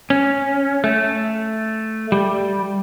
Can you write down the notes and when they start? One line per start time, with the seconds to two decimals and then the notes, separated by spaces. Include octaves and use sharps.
0.10 C#4
0.84 A3
2.12 G3